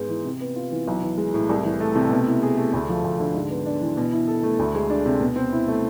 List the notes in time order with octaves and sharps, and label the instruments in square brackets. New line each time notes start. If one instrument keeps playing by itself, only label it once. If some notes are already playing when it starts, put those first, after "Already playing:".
Already playing: [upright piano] G#2 G#3 B3
E3
C3
B3
F4
E3
B1
E3
G#3
A2
C2
E3
A3
C3
B2
E4
G#4
A3
D2
F3
D2
D3
G#2
B3
D4
E3
B2
E4
A4
A3
D2
G#3
D4
C3
B2
C4
E4
A3